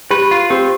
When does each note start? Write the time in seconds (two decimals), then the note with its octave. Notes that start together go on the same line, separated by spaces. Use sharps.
0.11 G4 B4
0.31 F4
0.50 C4 G4